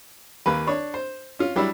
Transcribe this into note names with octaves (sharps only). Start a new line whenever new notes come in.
D#2 A#3 B4
D4 C#5
C5
C#4 F4
F#3 G3 D4 E4